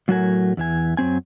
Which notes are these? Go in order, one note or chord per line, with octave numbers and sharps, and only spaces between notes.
A2 F#3 A3 F#4 A#4 G#5
E2 E3 G#5
F#2 F#3 C4 G#5